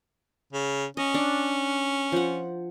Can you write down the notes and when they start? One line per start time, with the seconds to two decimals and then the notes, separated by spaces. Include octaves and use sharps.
0.53 C#3
0.97 C#4 D#5
1.14 D4
2.12 F3 F#5